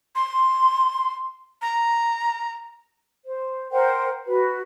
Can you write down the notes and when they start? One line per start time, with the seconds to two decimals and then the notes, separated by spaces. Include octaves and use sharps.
0.15 C6
1.62 A#5
3.26 C5
3.71 A#4 C5 F#5 G5
4.27 F#4 B4